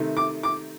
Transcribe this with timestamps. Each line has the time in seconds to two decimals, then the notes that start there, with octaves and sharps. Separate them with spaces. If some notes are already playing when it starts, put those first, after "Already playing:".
Already playing: C3 D#3 A3
0.17 D6
0.43 D6